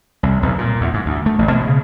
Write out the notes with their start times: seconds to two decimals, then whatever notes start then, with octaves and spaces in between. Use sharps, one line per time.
0.23 C2
0.43 B1
0.58 A#2
0.81 E2
0.94 G#2
1.06 D2
1.26 A3
1.39 A1
1.52 B2
1.67 C#3